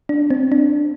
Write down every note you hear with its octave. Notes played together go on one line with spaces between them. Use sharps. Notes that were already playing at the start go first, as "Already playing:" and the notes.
D4
C4
D4